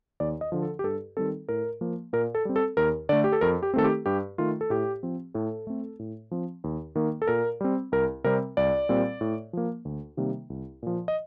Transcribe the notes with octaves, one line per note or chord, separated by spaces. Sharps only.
D#2 D5
D#5
D3 F3
A4
G4
G2 A4
D#3 G3 C4 A4
A2 A#4
F3 A#3
A#2 A#4
A4
G3 C4
A4
D#2 A#4
D3 A3 D5
G4
A4
F2 A#4
G4
D#3 A3 C4 A4
G4
G2 G4
D#3 A3 F4
A4
A2 G4
F3 C4
A2 A4
A3 C4
A2
F3 C4
D#2
D#3 A#3
A4
A#2 A#4
G3 C4
C2 A#4
C3 G3 C4 A#4
C2 D5
A#2 G3 C4
A2
F3 A#3
D2
C3 D#3 G3 A#3
C2
A#2 F3
D#5